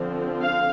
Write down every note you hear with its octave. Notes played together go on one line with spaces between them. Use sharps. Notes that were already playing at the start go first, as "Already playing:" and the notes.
Already playing: D3 F3 C4
F5